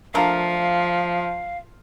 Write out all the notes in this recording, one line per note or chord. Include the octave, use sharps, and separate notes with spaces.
F3 A3 D4 A#4 F5